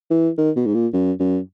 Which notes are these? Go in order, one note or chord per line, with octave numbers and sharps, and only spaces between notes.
E3
D#3
B2
G#2
A#2
F#2
F#2